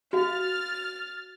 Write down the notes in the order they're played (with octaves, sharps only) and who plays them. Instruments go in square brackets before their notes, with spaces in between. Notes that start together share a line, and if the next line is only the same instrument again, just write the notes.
[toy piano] F#4 F5 [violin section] F6 A6